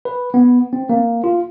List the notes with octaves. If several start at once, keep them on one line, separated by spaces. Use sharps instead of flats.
B4
B3
C4
A#3
F4